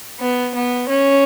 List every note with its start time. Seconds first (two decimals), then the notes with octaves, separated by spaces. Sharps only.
0.20 B3
0.55 B3
0.89 C#4